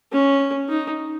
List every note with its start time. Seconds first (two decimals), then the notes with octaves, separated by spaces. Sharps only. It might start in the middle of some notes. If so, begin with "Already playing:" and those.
0.12 C#4
0.69 D#4